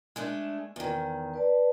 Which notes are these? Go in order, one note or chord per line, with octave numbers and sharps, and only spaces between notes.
G#3 A3 D4
E2 D#3
B4 D5 A5